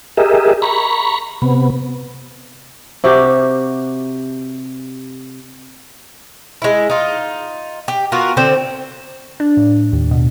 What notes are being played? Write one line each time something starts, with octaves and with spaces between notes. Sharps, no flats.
G4 G#4 A#4 D#5 E5
A#5 B5 C#6
C3 B3
C3 F#4 G4
G#3 E4
D#4 F4
G4
B3 F4 F#4 A#4
D3 C4 C5
D4
A2
D#2
B2